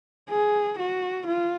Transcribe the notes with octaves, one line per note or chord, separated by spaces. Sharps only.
G#4
F#4
F4